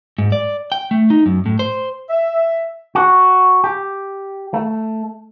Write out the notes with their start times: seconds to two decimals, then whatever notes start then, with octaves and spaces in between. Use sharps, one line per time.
0.18 G#2
0.32 D5
0.72 G5
0.91 A3
1.10 D#4
1.26 F#2
1.46 A2
1.59 C5
2.10 E5
2.95 F#4
3.64 G4
4.54 A3